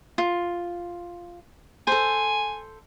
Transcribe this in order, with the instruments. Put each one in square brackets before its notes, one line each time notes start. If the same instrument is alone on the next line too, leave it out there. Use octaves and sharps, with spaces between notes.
[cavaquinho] F4
[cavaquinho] A4 C5 [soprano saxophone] G#5